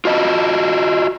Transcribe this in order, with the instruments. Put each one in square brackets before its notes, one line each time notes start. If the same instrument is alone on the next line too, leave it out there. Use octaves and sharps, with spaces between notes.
[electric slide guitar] F4 F#4 D#5